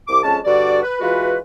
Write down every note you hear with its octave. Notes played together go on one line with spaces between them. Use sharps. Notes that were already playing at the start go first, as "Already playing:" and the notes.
C2 D6
F2 G#3 C#4 A5
G2 D3 F#4 D5
B4
E3 G#3 F4 F#4 B4